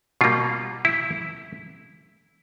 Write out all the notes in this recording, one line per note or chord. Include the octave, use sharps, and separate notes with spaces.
B2 G3 A#3 F4
E4